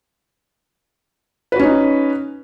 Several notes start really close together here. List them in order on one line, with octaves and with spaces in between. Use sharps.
B4 F#4 C#4 D#4